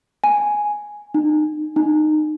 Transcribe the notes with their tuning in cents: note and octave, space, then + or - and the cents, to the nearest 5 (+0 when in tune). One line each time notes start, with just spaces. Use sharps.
G#5 +0
D#4 -35
D#4 -25